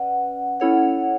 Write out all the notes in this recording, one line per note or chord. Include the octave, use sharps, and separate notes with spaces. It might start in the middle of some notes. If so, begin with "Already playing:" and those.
Already playing: C#4 B4 D5 F#5
C#4 E4 A4 C#5 F#5